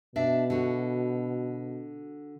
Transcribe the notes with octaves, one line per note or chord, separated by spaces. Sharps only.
B2 D4 E5
D3 F#4